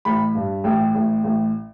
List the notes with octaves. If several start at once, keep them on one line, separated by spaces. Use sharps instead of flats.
A1 B5
G2
A1 G5
A1
A1